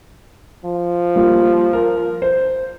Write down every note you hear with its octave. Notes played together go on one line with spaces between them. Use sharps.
F3
G3 A#3 F4
A#4
C5